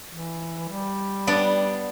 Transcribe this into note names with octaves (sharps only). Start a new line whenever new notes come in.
E3
G3
B3 D4 D5